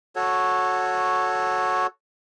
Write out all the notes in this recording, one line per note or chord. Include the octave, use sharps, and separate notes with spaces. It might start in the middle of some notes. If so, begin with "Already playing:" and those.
F#4 A4 C#5